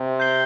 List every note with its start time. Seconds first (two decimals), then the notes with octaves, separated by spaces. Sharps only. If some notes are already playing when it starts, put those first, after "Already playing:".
Already playing: C3
0.20 G6 C7 G7